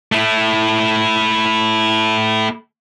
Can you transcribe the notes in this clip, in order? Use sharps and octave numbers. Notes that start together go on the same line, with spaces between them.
A3 E4